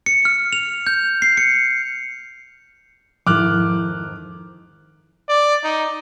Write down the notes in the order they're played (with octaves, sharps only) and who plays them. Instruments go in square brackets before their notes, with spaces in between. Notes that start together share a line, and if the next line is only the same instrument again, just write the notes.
[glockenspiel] C#7
F6
F7
G6
C7
C#7
[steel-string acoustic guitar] F2 G#2 D#3 [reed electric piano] F3 E4 [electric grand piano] D6 F6 F#6
[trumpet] D5
D#4